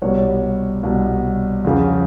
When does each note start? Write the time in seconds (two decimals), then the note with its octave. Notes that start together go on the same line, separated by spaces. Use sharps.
0.02 C2 B2 G3 C#5
0.83 C2 B2 G3
1.64 E2 C#3 F3